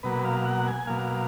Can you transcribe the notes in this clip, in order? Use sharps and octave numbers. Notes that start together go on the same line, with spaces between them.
B2 F#3 A#3 B4
F5
F#5
G#5
B2 F#3 A#3 F5